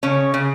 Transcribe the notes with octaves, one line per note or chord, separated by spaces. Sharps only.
C#3 C#4
C#3